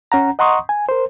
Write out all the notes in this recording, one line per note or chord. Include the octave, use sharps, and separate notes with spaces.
C#4 F#5 A#5
D#5 F#5 A#5 C6 C#6 D#6
G#5
A#4 C5